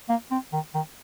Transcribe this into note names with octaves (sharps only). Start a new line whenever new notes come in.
A#3
C4
D#3
D#3